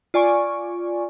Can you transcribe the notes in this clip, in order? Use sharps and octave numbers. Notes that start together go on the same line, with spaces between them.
F4 D5 G#5 C#6